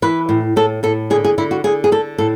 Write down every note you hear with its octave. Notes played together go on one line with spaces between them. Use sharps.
E3 B4
A2
A2 A4
A2 A4
D3 G#4
G#4
D3 E4
F#4
D3 G#4
G#4
D3 A4
A2 A4